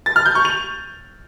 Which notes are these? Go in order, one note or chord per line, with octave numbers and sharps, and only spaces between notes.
A6
F6
G6
C#6
F7